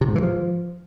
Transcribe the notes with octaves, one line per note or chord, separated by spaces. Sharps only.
C3
G#2
E3
F3